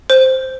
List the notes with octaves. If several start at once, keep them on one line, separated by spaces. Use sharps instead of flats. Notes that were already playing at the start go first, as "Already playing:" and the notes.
C5